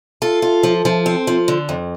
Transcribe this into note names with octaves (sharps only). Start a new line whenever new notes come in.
F4 A4
F4
F3
F3
C4
F3
D3
F2